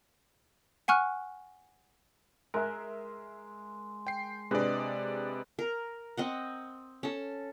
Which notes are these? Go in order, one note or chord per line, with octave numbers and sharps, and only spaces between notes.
F#5 G#5 C#6 F6 F#6
G#3 A#4 E5
G5 C7
C3 G#3 D4 B4 D5 D#5
A#4
C4 D#5 F#5
C#4 A4